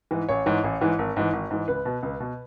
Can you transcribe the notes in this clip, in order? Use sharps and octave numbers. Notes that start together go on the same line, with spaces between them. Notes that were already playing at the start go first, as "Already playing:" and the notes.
G#2 E3
A1 C#5
G#2 E3
A1
G#2 E3
G#1
G#2 E3
G#1
G#2 E3
C#2 B4
B2
C#2
B2